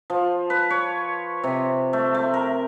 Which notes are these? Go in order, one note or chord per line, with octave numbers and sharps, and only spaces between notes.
F3
B4
C#5
C3
A3
A3
A#4